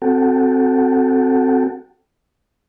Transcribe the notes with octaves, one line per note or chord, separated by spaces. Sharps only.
C4 F#4 A4 F#5 G5 A5